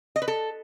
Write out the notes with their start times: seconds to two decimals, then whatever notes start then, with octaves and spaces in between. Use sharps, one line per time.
0.16 D#5
0.22 B4
0.28 A4